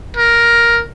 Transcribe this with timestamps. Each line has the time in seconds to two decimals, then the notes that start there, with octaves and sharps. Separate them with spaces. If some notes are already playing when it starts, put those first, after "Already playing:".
0.17 A#4